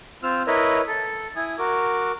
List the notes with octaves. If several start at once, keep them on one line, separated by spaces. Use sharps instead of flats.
C4 F4 E6 F6
E4 A#4 B4 C#5 D#5
A4
E4 G#5 D#6
F#4 A#4 D6